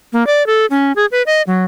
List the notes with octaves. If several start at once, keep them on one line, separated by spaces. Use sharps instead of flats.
A#3
D5
A4
C#4
G#4
B4
D#5
F#3